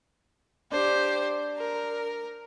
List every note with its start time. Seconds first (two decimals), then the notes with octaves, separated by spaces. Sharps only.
0.72 D4 G4 C5
1.58 A#4